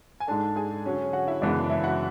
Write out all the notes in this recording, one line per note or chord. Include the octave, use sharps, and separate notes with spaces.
G#5
G#2 G#3 D4 A4 A5
G#4 G#5
D3 F#3 C#4
F#4 F#5
E4 E5
F#2 C#3 E3 G#3 B3 D4 D5
E4 E5
F#4 F#5